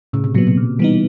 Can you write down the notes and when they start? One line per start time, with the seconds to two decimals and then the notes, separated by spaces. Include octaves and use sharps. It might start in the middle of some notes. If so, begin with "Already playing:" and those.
0.13 A2 C#3
0.24 C3
0.35 A#2 F#3 B3
0.47 B2
0.57 A#2
0.79 E3 G3 B3 D#4